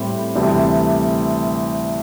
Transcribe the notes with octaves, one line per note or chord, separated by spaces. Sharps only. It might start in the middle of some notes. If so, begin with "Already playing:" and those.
Already playing: A2 G3 C4 E4 G4
D2 C3 E3 G3 D4